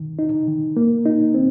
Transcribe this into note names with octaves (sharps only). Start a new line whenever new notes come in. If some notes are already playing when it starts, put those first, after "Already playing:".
Already playing: D#3
D#4
D#3
A#3
D#4
C4